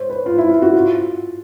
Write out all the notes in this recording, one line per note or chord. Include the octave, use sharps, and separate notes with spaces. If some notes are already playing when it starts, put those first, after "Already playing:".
Already playing: C5 C#5
B4
F4
E4
F4
F#4
F4